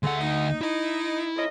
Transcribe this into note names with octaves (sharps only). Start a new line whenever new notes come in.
D2 G#3 A3 F#5
D#4
D#4 E4
F2 C#4 D#5